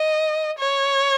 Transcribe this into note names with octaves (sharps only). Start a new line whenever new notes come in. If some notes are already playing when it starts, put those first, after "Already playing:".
Already playing: D#5
C#5